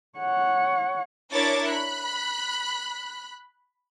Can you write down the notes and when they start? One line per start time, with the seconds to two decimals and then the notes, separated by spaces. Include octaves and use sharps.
0.19 C#5 F#5
1.32 D4 E4 A#4 C#5 D6 A6
1.70 B5 F#6